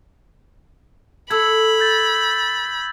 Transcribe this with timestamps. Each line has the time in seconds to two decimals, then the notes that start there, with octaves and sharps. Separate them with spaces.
1.30 A4 B5 E6 G#6
1.80 G6 A6